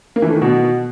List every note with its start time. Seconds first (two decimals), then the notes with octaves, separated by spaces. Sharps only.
0.16 A#3
0.22 E3
0.29 A3
0.35 D#3
0.42 B2